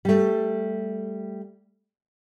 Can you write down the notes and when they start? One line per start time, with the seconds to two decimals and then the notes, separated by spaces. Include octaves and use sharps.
0.05 G3 A3